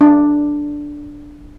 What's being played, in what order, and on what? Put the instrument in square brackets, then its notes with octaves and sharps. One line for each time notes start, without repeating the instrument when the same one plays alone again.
[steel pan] D4